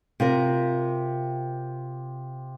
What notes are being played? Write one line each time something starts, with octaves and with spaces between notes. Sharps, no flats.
C3 F4 A#4